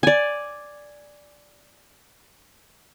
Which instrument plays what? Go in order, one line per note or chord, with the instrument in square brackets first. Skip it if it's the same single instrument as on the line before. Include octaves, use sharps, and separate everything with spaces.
[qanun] D5 G#5